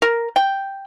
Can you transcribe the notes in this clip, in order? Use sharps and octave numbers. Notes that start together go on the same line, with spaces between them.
A#4
G5